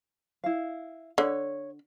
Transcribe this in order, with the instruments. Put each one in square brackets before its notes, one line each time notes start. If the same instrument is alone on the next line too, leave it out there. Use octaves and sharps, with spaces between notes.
[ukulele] E4 F5
[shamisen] D3 [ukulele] C#5